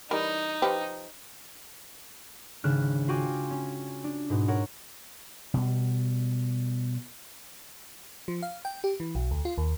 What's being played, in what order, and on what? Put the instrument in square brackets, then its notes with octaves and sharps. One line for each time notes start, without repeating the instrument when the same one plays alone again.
[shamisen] E3 G3 A#4 [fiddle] D#4
[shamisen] F3 G4 B4
[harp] G#1 C#3 D4 F6 F#6 E7
F4 F#4 G5 G#5 C6 D6
C#4
D4
G#2 B2
A#4 C#5 F#5
[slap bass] B2 G3
[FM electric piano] F3
F5
G5
G4
E3
B1
D2
F4
D#2